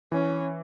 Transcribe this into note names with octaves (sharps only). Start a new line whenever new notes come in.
E3 C#4